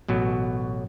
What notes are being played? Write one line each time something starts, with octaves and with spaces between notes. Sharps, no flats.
A1 B2 F#3